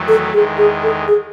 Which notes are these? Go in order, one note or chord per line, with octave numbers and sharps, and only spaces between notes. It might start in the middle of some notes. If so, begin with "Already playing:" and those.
Already playing: E2 D#3 F#3 A3
A4
E2 D#3 G#3 G#4
G#4
A4
G#4